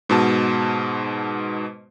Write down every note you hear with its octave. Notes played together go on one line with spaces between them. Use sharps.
G#2 B2 A5